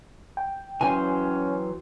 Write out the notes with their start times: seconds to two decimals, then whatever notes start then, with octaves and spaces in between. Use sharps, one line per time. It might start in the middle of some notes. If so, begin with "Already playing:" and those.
0.37 G5
0.81 E3 F#3 C#4 C5 G#5